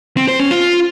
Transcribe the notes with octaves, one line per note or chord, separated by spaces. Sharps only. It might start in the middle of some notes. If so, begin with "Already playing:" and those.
C4
C5
C#4
F4